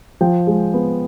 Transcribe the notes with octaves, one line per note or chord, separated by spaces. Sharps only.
F3 G5
G#3
B3